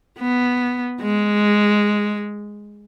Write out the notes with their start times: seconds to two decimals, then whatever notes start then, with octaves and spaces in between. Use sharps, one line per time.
0.19 B3
1.01 G#3